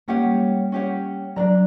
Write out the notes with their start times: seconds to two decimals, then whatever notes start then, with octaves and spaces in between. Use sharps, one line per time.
0.08 A#3 C#4 G4 C#5 F#5
0.24 G3
0.40 G3
0.72 C#4 G4 C#5 F#5
1.36 F#3 D4 A#4 D5 A#5